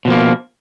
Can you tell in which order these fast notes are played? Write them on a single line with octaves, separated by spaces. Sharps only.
B2 F3 A#3